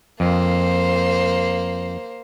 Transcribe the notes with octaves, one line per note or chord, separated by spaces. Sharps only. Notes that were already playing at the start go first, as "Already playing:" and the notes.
F2 A#3 C5